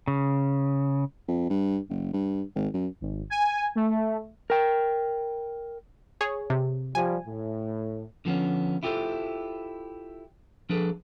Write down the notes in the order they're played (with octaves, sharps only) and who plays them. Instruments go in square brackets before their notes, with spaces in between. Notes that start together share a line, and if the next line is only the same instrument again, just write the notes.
[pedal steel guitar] C#3
[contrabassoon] F2
G2
F#1
G2
G#1
F#2
[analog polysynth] G#1
G#5
A3
[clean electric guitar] A#4 G5
[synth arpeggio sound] G#4 C#5
C3
[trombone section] F3 G3 [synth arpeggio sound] G#5
[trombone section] A2
[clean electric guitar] D3 F3 B3 C#4
E4 F4 G4 A4 A#4 C5
F3 D4 G#4 A4 B4